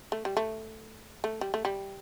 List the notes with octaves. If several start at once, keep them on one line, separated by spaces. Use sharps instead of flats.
A3
G3
A3
A3
G3
A3
G3